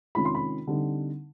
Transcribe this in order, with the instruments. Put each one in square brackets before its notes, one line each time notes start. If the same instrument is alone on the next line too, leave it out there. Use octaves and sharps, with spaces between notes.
[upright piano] C3 D#3 G#3 C#4 F4 B5
C6
B5
D3 G3 C4 D#4